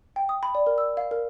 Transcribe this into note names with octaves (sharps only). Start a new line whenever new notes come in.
G5
D#6
B5
D5
A#4
E6
F5
A#4